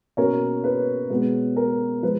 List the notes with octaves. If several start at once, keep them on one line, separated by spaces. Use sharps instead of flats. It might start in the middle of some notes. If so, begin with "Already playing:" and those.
B2 A#3 C#4 A#4 C#5
B4
B2 G#3 B3 B4
A#4
F3 G#3 B4